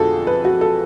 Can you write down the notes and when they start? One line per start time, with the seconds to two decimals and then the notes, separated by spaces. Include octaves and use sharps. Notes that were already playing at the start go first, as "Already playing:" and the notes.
Already playing: F2 D3 G#3 B3 F#4 G#4 A4
0.27 B4
0.45 F#4
0.61 A4